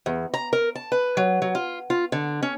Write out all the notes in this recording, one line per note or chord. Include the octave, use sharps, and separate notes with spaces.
E2
A#5
A#4
A5
B4
F#3
F#3
F4
F4
D3
C#4